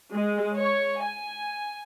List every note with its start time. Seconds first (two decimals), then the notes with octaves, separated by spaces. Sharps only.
0.13 G#3
0.57 C#5
1.02 G#5